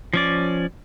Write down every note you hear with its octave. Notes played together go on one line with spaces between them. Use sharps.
F3 C#4 D5